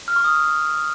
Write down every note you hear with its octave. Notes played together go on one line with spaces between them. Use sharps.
F6
C#6
D#6